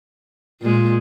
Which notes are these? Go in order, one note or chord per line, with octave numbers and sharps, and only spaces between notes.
A#2 G#3 F4